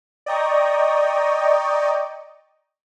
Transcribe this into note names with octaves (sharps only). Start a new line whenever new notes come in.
D5 D#5 G5 A#5 C#6 D#6